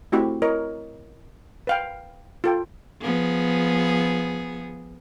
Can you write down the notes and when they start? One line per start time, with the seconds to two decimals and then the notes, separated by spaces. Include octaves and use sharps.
0.12 A3 C4 E4 F#4 G4
0.42 E4 A#4 C#5 D#5
1.67 B4 F5 G5
2.44 F4 A4 G5
3.02 F3 B3 G#4